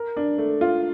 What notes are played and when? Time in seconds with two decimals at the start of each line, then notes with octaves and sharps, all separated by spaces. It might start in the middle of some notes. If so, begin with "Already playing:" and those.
Already playing: A#4
0.17 D4
0.38 A3
0.61 F4